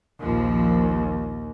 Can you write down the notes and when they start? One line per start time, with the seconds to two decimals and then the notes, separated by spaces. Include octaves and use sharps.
0.21 A#1 D#2 F3